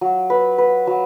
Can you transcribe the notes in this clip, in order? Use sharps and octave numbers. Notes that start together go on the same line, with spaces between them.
F#3
B4
B4
F#3